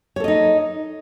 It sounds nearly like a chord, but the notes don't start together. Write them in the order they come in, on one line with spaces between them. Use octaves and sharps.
C#5 A4 D#5 D#4